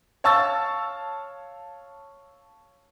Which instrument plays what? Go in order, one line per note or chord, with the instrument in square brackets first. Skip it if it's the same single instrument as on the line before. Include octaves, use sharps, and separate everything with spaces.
[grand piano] C#5 F5 A5 C#6 E6 A6